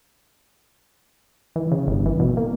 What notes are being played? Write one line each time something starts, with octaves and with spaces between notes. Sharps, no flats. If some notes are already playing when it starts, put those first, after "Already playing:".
E3
C#3
G1
E3
B2
A#3